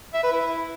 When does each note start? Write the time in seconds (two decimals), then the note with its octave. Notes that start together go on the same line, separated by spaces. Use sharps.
0.14 E5
0.23 B4
0.32 E4